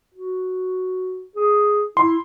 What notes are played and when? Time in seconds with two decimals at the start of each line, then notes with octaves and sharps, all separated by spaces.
0.14 F#4
1.36 G#4
1.97 E4 C6